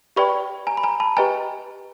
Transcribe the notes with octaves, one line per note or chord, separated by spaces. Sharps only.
G4 B4 D5 G5 B5 C#6
G#5 A#5
B5
G#5 A#5
A5 B5
G4 B4 D#5 G5 G#5 A#5